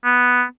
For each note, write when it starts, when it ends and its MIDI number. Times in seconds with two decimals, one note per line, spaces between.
0.04 0.44 59